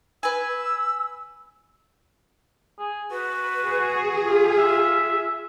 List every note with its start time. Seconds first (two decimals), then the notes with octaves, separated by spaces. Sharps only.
0.23 B4 G#5 E6
2.79 G#4
3.11 F#4 B4
3.69 G#4
4.21 F4
4.58 F4 E5